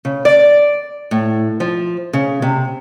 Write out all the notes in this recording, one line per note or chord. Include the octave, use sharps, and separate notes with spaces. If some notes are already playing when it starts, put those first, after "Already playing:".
C#3
D5
A2
F3
C#3
C3